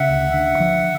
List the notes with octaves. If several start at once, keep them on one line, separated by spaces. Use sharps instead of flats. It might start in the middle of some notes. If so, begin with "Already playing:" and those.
Already playing: C#3 E5 F#5
D2
D3
F3